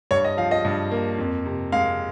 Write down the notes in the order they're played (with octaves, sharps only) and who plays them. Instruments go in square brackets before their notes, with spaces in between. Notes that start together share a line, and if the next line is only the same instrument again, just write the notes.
[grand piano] G2 C#5
D#5
F3 F5
D#5
G2
A#3
F2
C3
G#3 F5